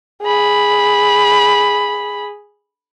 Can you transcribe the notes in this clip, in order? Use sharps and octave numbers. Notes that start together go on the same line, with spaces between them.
G#4 B5